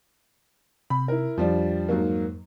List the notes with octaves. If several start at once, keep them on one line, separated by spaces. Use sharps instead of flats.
C3 B5
E4 A#4
F2 F3 G3 D4
G#2 F#3 A#3